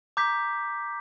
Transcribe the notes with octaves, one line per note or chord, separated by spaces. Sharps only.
A#5 D6 G6 B6